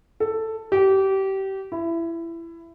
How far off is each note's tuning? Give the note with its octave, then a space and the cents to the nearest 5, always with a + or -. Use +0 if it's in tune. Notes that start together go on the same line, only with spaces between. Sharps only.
A4 +10
G4 -25
E4 +20